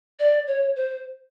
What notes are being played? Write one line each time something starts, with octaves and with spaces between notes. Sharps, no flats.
D5
C#5
C5